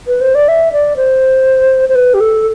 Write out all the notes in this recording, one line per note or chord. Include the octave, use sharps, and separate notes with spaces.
B4
C5
D5
E5
D5
C5
C5
B4
G4
A4